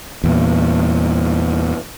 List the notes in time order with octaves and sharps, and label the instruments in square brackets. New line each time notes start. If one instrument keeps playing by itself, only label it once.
[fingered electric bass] E2 A#2